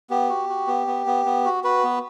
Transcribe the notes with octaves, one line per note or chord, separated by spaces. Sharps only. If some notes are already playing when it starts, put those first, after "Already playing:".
B3 G4
F#4
F#4
B3
B3
B3
B3
F#4
F#4 B4
B3